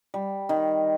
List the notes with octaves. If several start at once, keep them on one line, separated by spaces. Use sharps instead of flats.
G3
D#3